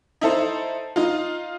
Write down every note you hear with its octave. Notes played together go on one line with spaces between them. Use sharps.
D#4 E4 A4 C5
D#4 F4